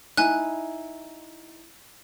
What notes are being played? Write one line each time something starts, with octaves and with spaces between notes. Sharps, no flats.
D#4 E4 G#5 F#6